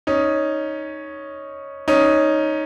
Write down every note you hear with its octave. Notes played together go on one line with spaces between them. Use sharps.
C#4 D#4
C#4 D#4